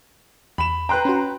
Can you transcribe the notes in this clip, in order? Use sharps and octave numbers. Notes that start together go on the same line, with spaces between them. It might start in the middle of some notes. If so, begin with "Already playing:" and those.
E2 B5 E7
B4 G5 A#5 C6 F#6
C#4 F#4